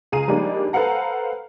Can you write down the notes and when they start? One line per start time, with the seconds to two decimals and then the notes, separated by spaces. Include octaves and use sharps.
0.12 C#2 G#4 F5 A#5 D#7
0.27 F3 G3 G#3 A#3 D4 D#4
0.73 A4 B4 C5 F5 F#5 A#5